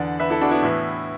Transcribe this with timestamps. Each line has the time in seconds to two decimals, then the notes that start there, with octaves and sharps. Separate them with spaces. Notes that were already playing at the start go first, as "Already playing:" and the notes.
Already playing: E2 D3 D5 F#5
0.20 B4 E5
0.30 E4 A4
0.41 D4 F#4
0.51 B3 E4
0.62 A2 E3